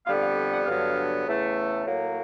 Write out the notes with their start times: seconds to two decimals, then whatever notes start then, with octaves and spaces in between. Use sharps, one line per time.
0.07 F2 D3 G3 B3 F5
0.21 F5
0.52 F#5
0.66 G2 D3 F#3 B3 F5
1.26 E2 C#3 E3 A3
1.85 A2 F#3 A#3